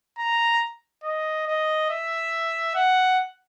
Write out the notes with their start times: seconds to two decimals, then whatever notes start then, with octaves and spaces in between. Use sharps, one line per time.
0.19 A#5
1.04 D#5
1.47 D#5
1.90 E5
2.75 F#5